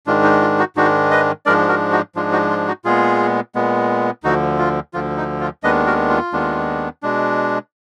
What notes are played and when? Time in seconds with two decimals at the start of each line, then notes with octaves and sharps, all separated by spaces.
0.07 G#2 D#3 G#3 D4 F4
0.23 D#4
0.41 F4
0.59 D#4 F#4
0.76 G#2 D#3 G#3 D4 D#4 F#4
1.11 B4 D#5
1.46 G#2 F3 G#3 D4 A#4 D5
1.68 F#4 A#4
1.92 D#4 F#4
2.15 G#2 F3 G#3 D4 F4
2.32 D#4 F#4
2.50 F4
2.67 D#4 F#4
2.85 A#2 G#3 B3 F4 G#4
3.55 A#2 G#3 B3
4.24 D2 D3 F3 D#4 F#4
4.59 F4
4.93 D2 D3 F3 F4
5.17 D#4
5.41 F4
5.63 D#2 D#3 G#3 B3 D4 B4 D#5
5.86 F#4 A#4
6.09 F4
6.33 D#2 D#3 G#3 B3 D4
7.03 B2 G#3 D4